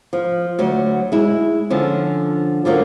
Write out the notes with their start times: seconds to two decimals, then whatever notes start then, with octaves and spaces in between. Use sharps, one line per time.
0.13 F3
0.59 D2 F#3
1.12 G#3 E4
1.70 D3 F3 C#4
2.65 D3 F3 F#3 A#3